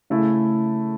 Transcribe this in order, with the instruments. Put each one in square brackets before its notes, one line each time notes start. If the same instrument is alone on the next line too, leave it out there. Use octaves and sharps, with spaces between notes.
[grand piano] C#3 A3 E4